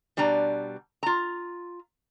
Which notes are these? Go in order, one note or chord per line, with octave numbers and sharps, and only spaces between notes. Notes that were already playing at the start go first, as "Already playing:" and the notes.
B2 G3 D4 A#5
F4 A#5